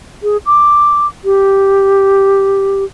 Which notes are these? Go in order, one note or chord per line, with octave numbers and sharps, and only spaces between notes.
G#4
D6
G4